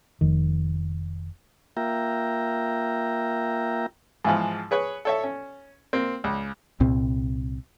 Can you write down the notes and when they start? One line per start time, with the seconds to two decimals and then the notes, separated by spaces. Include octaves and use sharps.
0.21 F1 D#3
1.77 A#3 F4 E5 G5 A#5
4.25 G#2 E3 F3
4.71 G#4 B4 C#5
5.05 A4 C#5 E5
5.24 C#4
5.93 A#3 C4
6.24 C#2
6.80 C2 A#2 C4